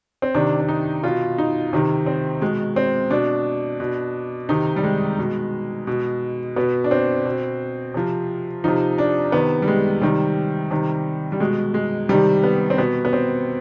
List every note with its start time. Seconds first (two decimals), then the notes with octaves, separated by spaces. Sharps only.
0.22 C4
0.34 C3 D#3 D4
0.60 D4
0.68 D#4
1.03 B2 F4
1.38 D#4
1.73 C3 D#3
2.06 C4
2.41 B2 G#3
2.76 C4
3.10 B2 D4
3.80 B2
4.49 C3 D#3 D#4
4.76 G3
4.84 G#3
5.18 B2
5.87 B2
6.56 B2 B3
6.84 D4
6.91 C4
7.25 B2
7.94 C3 F3
8.64 C3 F3 D#4
8.98 D4
9.32 C3 D#3 B3
9.62 G3
9.68 G#3
10.01 C3 D#3 G3
10.71 C3 D#3
11.32 G3
11.40 B2 G#3
11.74 G#3
12.09 C3 D#3 G3
12.44 B3
12.70 C4
12.78 B2 B3
13.05 B3
13.13 C4